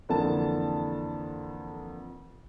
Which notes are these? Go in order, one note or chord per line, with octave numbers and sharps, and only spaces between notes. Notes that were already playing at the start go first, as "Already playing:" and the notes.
F2 D3 E3 A#3 A5